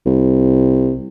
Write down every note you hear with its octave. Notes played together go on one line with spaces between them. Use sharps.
C2